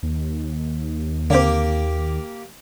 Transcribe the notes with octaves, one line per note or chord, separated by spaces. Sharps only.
D#2
D3 A#3 C4 G4